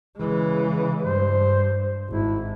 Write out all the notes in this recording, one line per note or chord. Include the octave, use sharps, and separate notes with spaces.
C#3 E3 G#3
G2 C5
G#1 E4